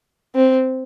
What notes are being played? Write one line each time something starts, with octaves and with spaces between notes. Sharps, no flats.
C4